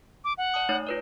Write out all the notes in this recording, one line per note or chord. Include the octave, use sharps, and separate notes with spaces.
D6
F#5
D5 A5 D#6
A3 D#4 C#5
F4 B4 D5